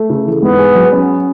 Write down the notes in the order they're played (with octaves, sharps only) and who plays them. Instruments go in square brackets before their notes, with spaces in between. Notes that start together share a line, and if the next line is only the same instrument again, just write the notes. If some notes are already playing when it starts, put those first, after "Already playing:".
Already playing: [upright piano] A3
C#3
E3
[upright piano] G#2 [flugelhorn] B3
[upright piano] G#4
F#3
C#4